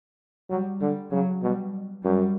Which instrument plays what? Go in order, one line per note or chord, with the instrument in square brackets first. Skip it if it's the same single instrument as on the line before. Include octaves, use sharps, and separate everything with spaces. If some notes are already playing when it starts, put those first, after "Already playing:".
[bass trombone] F#3 [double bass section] G3
[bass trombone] D3 [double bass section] G3
[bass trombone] C#3 [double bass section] F#3
[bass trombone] B2 [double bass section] G3
[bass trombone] F#2 [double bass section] G3